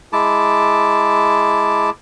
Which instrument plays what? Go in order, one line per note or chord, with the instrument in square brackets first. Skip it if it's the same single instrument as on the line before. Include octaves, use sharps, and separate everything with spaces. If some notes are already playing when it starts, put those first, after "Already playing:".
[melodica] G#3 E4 A5 D6